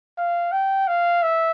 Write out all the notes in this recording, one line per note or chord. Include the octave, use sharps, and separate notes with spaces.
F5
G5
F5
E5